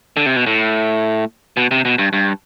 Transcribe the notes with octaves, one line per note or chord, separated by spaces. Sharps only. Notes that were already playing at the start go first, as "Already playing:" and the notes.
D3
C3
B2
A2
B2
C3
B2
G2
G2